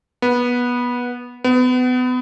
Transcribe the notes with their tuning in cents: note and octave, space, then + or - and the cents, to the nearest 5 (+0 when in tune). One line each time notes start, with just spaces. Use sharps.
B3 -15
B3 +30